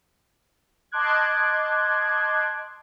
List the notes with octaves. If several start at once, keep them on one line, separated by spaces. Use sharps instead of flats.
D#5 A5 C6 D6 F#6 G#6